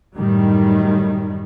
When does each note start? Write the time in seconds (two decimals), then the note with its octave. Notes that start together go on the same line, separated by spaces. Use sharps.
0.16 F#2 A2 D#3 G3